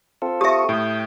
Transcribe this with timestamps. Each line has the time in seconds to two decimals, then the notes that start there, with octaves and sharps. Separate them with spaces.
0.22 C4 F4 A4
0.41 G4 E5 C#6 D#6
0.69 A2 G5